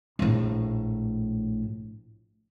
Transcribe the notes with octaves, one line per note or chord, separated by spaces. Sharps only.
A#1 A2